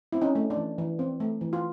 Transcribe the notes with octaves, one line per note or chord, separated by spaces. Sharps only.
C4 E4
C#4 D#4
A3
D4
E3
E3
C4
A3
E3
F4